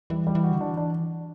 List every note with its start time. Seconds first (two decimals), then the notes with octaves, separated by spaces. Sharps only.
0.10 E3 G3
0.27 G3
0.35 E3
0.43 F#4
0.52 D3
0.60 E3 D4
0.77 D4